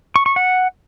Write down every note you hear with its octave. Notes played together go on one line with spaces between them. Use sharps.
C#6
C#6
F#5